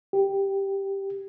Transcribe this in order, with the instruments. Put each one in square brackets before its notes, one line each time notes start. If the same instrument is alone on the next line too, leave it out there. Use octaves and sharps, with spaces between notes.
[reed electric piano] G4